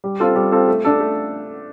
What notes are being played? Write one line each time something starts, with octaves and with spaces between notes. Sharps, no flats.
G3
C4 F4 A4
G3
C4 F4 A4
A3
D4 A4
A3